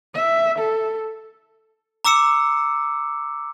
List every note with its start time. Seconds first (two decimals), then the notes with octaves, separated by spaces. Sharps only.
0.14 E5
0.59 A4
2.05 A#5 D6 E6 C#7 E7